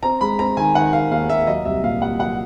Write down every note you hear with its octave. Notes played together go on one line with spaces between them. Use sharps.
C4 A#5
G#3 B5
C4 A#5
D#3 G#5
D#3 F#5
D#3 F5
D#2 F5
D#2 E5
F#3 D#5
C2 E5
A#2 F5
C2 F#5
F#3 F#5